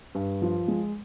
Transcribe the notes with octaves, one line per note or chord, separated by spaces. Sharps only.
G2
F3
G#3